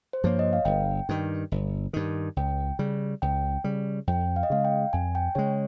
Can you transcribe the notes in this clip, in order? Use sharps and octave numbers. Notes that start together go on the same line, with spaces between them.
C5
G2 F3 A#3 C#5
D#5
F5
G1 G5
G2 D#3
G1
G2 D#3
C#2 G5
C#3 G3
C#2 G5
C#3 G3
F2 G5
F5
D#5
C#3 G#3 F5
G5
F2 G#5
G5
C#3 G#3 C#5